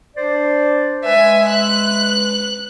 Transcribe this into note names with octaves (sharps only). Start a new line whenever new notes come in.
D4 C5 D5
G#3 B4 E5 G#5
F#6